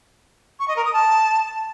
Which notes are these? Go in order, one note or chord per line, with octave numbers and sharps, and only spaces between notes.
C#6
D#5
A#4
D#6
A5